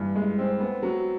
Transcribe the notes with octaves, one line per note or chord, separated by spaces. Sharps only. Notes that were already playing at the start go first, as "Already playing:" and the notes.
Already playing: G2 E3
G#3
C4
B3
F#3